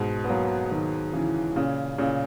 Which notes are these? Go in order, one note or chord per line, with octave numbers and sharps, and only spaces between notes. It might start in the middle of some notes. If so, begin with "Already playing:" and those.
Already playing: G#2 B2
B3
F#3 A#3
D#3 F#3
C#3 E3
A#2 C#3
A#2 C#3